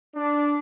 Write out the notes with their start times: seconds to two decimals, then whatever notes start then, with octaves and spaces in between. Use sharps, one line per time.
0.15 D4